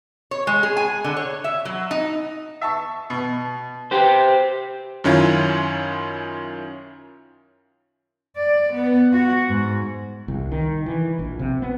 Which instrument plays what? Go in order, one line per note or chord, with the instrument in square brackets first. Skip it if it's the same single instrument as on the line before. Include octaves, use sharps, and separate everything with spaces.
[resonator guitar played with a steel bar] C#5
G#3
G#4
G#5
D3
C#5
E5
F#3
D#4
[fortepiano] E5 A5 C#6
B2
[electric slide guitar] G4 C5 [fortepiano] B4 G5
[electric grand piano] F#2 D#3 C#4 E4 F4
[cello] D5
B3
F#4
G#2
[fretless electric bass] C2
D#3
E3
A#1
C3
B3